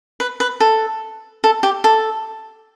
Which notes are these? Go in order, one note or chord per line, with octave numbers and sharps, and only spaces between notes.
B4
B4
A4
A4
G4
A4